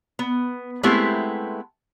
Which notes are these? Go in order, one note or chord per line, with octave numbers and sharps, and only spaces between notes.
B3
G#3 A3 B3 C4 E4 G4